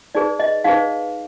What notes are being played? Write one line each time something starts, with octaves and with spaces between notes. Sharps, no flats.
D#4 G#4 B4 D5
D#5
D#4 G#4 B4 F5